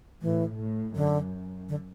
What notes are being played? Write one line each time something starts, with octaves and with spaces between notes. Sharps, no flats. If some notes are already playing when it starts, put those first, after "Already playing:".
A2 E3
A2
F#2 D3
D3